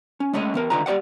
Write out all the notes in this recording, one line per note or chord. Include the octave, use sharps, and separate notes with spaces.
C#4
G#3 A3 C#4 C#5 D#5
E3 B3 A#4
D3 D#3 F4 B4 A#5
G3 G4 C5 D5 F#5